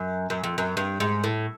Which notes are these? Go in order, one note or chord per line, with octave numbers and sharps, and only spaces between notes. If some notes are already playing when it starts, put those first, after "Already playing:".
Already playing: F#2
F#2
F2
F#2
G2
G#2
A2